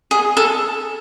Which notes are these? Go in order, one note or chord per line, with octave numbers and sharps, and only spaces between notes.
G#4
A4